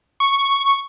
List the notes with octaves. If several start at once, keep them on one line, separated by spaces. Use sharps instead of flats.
C#6